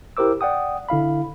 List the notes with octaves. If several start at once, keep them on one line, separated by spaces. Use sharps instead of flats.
E4 G4 A#4 C5 D6 E6
D5 F#5 G5 D#6
D3 E4 F5 B5